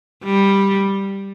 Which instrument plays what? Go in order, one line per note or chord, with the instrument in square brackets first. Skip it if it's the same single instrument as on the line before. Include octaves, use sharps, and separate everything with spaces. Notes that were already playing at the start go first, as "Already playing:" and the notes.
[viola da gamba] G3